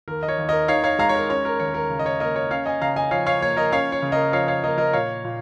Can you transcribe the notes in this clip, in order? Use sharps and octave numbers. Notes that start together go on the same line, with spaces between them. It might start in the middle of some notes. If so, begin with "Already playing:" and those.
D#2 A#4
D#5
C#5
D#2
A#4 D#5
D#3 C#5 F5
C#5 F5
G#3 F5 A#5
C#5
A#4
C#4 C#5
A#4
D#2 C#5
A#4
C#3
D#5
C#5
A#3 A#4 D#5
C#5
C#4 C#5 F5
D#5 G#5
C#3 F5 A#5
D#5 G#5
F3 C#5 F5
C#5 F5
A#3 C#5
A#4 D#5
C#4 C#5 F5
C#5
C#3
A#4 D#5
F3 C#5 F5
C#5 F5
A#3 A#4 D#5
A#4 D#5
A#2 C#5 F5
A#2